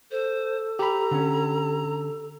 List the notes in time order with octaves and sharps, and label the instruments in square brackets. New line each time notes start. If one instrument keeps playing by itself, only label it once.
[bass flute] A4 [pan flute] C5
[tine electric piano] G4 B5 [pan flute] A#5
[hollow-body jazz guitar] D3 C#4